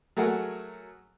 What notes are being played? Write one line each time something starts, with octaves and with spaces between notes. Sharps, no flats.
F#3 A3 G#4 A#4 F#5